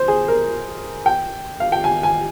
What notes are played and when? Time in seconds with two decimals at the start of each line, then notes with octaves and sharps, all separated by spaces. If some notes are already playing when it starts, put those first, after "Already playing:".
Already playing: C5
0.08 G#4
0.28 A#4
1.06 G5
1.60 F5
1.72 G5
1.84 G#5
2.03 G#5